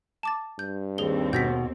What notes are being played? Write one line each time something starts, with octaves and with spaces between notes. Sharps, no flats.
A5 D6 A6
G2 G6
D#2 C4 G#4 G7
B2 G6 A#6 B6